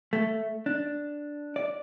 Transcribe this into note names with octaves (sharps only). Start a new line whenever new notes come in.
A3
D4
D5